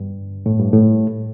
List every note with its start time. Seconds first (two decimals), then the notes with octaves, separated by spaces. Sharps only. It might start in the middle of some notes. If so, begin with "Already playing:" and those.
Already playing: G2
0.46 A2
0.60 G2
0.74 A2